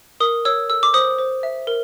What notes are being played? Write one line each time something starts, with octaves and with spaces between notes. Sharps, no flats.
A#4 D#6
C#5 E6
A4 E6
D6
C5 D#6
C5
E5
A#4